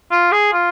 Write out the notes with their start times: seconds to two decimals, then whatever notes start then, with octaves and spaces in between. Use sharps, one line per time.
0.11 F4
0.32 G#4
0.53 F4